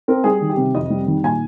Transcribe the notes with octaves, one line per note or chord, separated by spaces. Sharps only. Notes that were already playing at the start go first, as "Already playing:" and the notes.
C4 A#4
G3 G#4
D#3
G4
C3
F2 D#5
G3
D#3
A#2 G#5